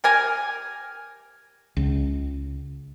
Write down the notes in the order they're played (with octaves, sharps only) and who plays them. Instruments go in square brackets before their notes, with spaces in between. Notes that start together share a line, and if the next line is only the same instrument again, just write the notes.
[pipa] G4 A#4 G#5
[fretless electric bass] C#2